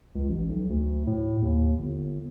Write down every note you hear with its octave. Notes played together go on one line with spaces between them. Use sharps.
C#2
A1
B1
D2
A2
D#2
G1